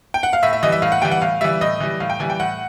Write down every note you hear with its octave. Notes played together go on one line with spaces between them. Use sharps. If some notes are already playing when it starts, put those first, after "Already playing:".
G5
F#5
F5
A2 E5
E5
E3 G3 D#5
E5
A2 F5
F#5
E3 G3 G5
F#5
A2 F5
E3 G3 E5
A2 D#5
E3 G3
A2 F5
G5
E3 G3 G#5
G5
A2 F#5